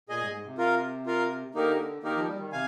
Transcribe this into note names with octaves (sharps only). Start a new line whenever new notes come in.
A#2 G#4 D#5 G#5
G#2
G#2
C3
F4 A#4 F5
F4 A#4 F5
D3 A#3 D#4 G4 A#4
D#3 A#3 D#4 G4 A#4
F3
G3
D#3
C3 F5 G#5